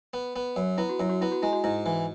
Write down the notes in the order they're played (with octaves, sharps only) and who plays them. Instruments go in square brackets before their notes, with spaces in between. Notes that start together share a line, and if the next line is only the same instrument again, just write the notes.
[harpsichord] B3
B3
F#2
[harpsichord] B3 [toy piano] E4
[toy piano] F#4
[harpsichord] F#2 [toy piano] E4
[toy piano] F#4
[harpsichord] B3 [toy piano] E4
[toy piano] F#4
[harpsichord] G#3 [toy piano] E4
[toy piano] F#4
[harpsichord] G#2 [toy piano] E4
[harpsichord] E3